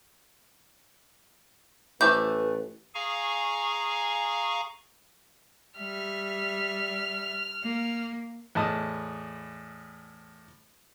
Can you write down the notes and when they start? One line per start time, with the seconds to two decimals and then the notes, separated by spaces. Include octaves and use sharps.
2.01 A1 E3 A3 B4 C5 D6 G6
2.95 G#4 F5 G#5 A#5 C#6
5.78 G3 E5 F6
7.63 A#3
8.55 E2 A2 D#5 A5 D#6